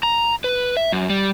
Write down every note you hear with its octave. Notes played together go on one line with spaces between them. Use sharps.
A#5
B4
E5
F#2
G3